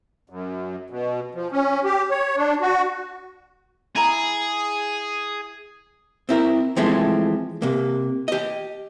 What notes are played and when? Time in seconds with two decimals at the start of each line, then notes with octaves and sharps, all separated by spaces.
0.30 F#2
0.90 B2
1.35 F3
1.51 C#4
1.84 G4
2.10 C#5
2.37 D4
2.61 F#4
3.96 E4 G#4 A#5 B5
6.29 C4 E4 A#4
6.76 E3 F3 G#3 A3 C4 E4
7.62 C3 A#3
8.28 G4 D#5